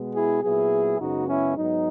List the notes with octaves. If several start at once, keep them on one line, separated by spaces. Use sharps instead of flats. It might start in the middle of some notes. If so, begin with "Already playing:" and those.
Already playing: B2 G#3 B3
E4 G#4
A#2 F#3 B3 E4 G#4
F#2 C#3 G#3 B3 D#4 F#4
C#4 E4
G#2 F#3 B3 D#4